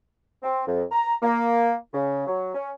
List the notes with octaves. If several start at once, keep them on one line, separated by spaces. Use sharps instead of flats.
C4
F2
A#5
A#3
C#3
F#3
C#4